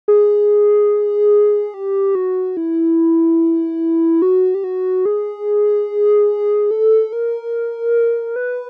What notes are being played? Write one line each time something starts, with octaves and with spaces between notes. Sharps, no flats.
G#4
G4
F#4
E4
F#4
G4
F#4
G#4
A4
A#4
B4